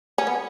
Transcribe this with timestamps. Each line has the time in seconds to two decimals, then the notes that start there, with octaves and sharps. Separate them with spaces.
0.18 C#4
0.27 B3